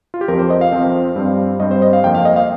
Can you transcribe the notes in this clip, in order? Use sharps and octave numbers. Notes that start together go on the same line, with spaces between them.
F4
G4
F2 F3 C4 A#4
C5
D#5
F5
F2 F3 C4
G2 G3 C4
G2 G3 C4 D#5
C5
D#5
F5
F2 F3 A#3 G5
F5
D#5
F5